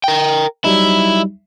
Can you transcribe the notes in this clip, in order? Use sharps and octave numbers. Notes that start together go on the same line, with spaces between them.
A#4 G5
F#3 G3 D#4 E4